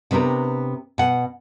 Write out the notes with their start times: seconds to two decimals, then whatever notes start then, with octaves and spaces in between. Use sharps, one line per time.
0.11 C3 B3 D4 G4 A#4
0.98 B2 F#5